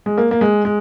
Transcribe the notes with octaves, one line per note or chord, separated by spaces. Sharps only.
G#3
A#3
A#3
G#3
G#3